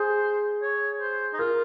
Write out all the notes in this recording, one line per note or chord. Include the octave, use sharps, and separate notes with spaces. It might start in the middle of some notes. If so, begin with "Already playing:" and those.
Already playing: G#4 C5
C#5
C5
D#4
F4 A#4